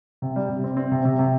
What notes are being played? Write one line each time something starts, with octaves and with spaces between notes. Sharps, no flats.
C3
G3
C3
C4
C4
C3
C3
C3